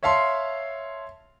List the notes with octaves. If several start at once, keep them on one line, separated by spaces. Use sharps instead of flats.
C#5 E5 F5 A5 C6